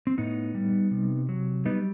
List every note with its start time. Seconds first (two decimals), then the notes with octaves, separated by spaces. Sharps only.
0.07 C4
0.18 A2 B3 D#4
0.55 G3
0.91 C3
1.29 F#3
1.65 G3 B3 D#4